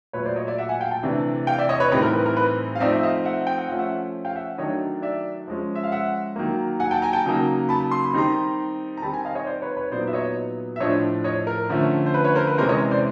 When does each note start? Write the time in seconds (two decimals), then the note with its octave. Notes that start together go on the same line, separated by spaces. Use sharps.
0.13 A#2 F#3 A3 B4 C#5
0.26 C5 D5
0.36 C#5 D#5
0.47 D5 E5
0.58 E5 F#5
0.69 F#5 G#5
0.81 F5 G5
0.91 G5 A5
1.03 C3 E3 A3 D4
1.47 F5 G5
1.58 D5 E5
1.69 C#5 D#5
1.80 B4 C#5
1.91 A2 E3 G3 C4 D#4 B4
2.02 A#4
2.13 B4
2.26 A#4
2.37 B4
2.75 F5
2.80 F3 A3 C4 D#4 D5 E5
2.93 E5
3.03 D#5 F5
3.24 E5 F#5
3.47 G5
3.58 F#5
3.69 F3 A3 C#4 F5
3.79 E5 F#5
4.25 F5 G5
4.35 E5 F#5
4.58 D#3 F#3 A3 D4 C#5 D#5
5.02 D5 E5
5.48 F3 G#3 C#4
5.75 E5
5.83 F5
5.92 E5 F#5
6.36 D#3 F#3 A#3
6.80 F#5 G#5
6.91 G5 A5
7.02 G#5 A#5
7.13 G5 A5
7.25 C#3 F#3 A#3 D#4
7.69 A5 B5
7.91 C6
8.04 B5
8.13 D#3 G3 C4 D#4 A#5 C6
8.97 A#5
9.02 D#3 G3 C4 A5 B5
9.13 G#5 A#5
9.25 D#5 F5
9.35 C#5 D#5
9.46 C5 D5
9.62 B4 C#5
9.77 B4 C#5
9.92 A#2 F#3 B3 D#4 C5 D5
10.07 E5
10.13 C#5 D#5
10.76 E5
10.80 A2 F3 A3 D4 C#5 D#5
11.24 C#5 D#5
11.47 A#4
11.69 D3 F3 A3 C#4
12.06 C5
12.14 B4
12.24 B4 C#5
12.35 A#4 C5
12.47 B4
12.58 C3 E3 G#3 C#4 A#4 C5
12.69 C#5 D#5
12.91 C5 D5